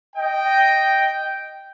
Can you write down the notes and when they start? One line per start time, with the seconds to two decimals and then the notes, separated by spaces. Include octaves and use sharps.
0.16 D#5 G5